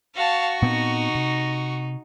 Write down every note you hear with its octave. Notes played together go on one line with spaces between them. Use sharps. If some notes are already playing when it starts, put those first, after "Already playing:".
F#4 F5 A5 C#6
A#2 B3 C4 D#4
C3